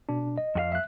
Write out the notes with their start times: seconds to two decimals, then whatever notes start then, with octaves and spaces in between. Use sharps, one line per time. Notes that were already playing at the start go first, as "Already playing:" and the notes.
0.09 B2 D4
0.38 D#5
0.55 F2 F#4 F5
0.72 E5 F#6